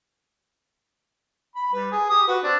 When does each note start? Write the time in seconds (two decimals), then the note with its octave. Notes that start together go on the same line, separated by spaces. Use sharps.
1.56 B5
1.73 G3 B4
1.92 G#4
2.10 G4 D#6
2.28 F#4 B4
2.43 C4 D4